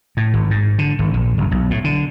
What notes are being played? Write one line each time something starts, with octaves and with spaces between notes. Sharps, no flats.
A2
G#1
G#2
D3
G#1
A#1
F#1
B1
A2
D3